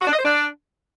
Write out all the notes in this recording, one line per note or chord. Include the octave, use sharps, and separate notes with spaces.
F#4
D4
D#5
C5
D4